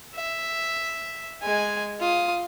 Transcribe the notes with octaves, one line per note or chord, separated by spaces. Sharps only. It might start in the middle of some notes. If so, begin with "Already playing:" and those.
E5
G#3 G#5
F4 D#6